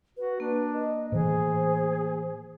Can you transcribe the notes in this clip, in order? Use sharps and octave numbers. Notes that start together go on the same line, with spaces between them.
F#4 B4
A#3 D4
D#5
A2 E3 G#4 C5